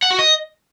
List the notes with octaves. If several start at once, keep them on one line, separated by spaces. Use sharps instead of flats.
F#5
F#4
D#5